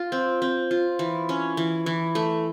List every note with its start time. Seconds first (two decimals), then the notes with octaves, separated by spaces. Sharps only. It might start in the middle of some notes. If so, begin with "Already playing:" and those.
Already playing: F4
0.12 C4
0.42 C4
0.71 F4
0.99 E3
1.29 C#4
1.57 E3
1.86 E3
2.15 A3